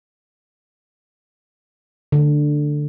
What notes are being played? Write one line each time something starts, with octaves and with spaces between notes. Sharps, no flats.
D3